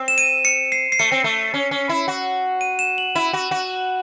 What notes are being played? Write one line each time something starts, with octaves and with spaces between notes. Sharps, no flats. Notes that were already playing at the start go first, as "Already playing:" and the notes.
Already playing: C4
E7
D#7
C#7
C7
C7
A3 C#7
C4
A3
C#4
C#4
E4
F#4
D#7
E7
F#7
E4 E7
F#4
F#4